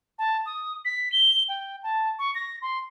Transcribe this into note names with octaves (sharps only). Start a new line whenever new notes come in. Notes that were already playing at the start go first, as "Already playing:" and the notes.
A5
D#6
B6
G7
G5
A5
C#6
A#6
C6